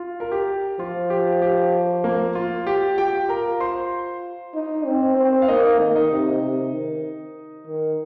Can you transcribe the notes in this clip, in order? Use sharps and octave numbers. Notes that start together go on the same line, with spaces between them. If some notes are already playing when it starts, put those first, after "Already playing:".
Already playing: F4
A#4
G4
F3 F4
G4
G4
A#3 A#4
F4
F4 G4
G4 G5
A#4 A#5
C5 C6
D#4
C4
C4
F5
A#3 D#4 D#5
D#3
D#4 D#5
C3
C3
D#3
D#3